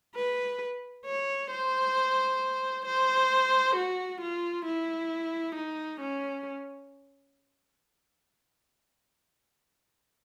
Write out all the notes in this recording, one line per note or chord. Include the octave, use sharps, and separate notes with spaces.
B4
C#5
C5
C5
F#4
F4
E4
D#4
C#4